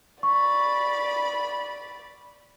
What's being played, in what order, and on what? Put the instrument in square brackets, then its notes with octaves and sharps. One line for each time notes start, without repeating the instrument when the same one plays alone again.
[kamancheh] D5 B5 [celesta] C#6